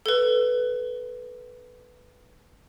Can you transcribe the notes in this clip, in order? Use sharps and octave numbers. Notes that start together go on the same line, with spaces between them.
A4 B4